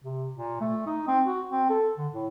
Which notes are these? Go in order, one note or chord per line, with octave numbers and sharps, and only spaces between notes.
C3
A#2
A3
D#4
C4
F#4
C4
A4
D3
A2